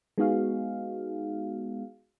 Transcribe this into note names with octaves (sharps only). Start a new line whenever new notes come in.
G#3 B3 D#4 F#4 G#4 F5